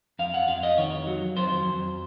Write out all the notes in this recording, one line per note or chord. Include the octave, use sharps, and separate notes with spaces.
F2 F5
F#5
F2 F5
D#5
D#3 C#5
F#3
F2 C5
F2